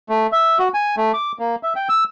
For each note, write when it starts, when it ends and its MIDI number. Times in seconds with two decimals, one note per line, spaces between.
0.09 0.27 57
0.32 0.58 76
0.59 0.68 66
0.74 0.95 80
0.97 1.12 57
1.14 1.32 86
1.39 1.56 58
1.63 1.73 76
1.76 1.88 79
1.89 2.04 88